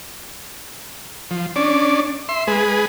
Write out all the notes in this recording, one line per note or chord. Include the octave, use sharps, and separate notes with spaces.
F3
C#4 D4 D5
E5 C6
G#3 G#4 B4